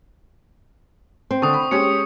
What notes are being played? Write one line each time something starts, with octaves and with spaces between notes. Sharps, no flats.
C4
D3 A4 C#6 D#6
B5
G#3 C#4 G4 C#7